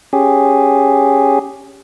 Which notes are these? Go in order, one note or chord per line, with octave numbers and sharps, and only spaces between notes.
C#4 G4 G#4